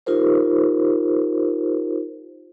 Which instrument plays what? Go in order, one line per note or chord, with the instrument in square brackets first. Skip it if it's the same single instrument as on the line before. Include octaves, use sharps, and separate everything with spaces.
[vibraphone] D#4 F4 G4 A#4 C5